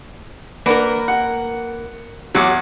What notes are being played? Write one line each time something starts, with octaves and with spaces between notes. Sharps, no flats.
A#3 D4 A#4 B4 F#5
F#5
E2 F#3 F#5 D6